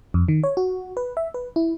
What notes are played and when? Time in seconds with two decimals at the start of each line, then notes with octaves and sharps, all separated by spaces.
0.14 F2
0.28 D#3
0.43 C#5
0.57 F#4
0.97 B4
1.17 E5
1.34 B4
1.56 E4